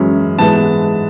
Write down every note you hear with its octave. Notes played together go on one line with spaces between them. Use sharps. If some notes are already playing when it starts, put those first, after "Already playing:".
Already playing: F#2 E3 G#3 C#4
G#2 E3 G#3 B3 A5